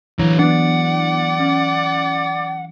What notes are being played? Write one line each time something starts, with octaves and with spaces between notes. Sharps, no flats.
D3 E3 F#3 C#5 A#5
B3 D4 D5 F#5
C#4